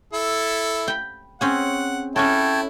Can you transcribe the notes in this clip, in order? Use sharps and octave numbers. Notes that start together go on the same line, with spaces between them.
E4 A4
G5 B5
C4 C#4 G#4 F#5
C#4 E4 F#4 A4 C#5 G5 A5